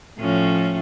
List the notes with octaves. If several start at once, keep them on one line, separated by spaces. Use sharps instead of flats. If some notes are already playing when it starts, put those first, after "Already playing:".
A2 F3 C#4